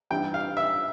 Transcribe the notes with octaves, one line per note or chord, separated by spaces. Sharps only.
G2 E3 G3 G5
F5
E5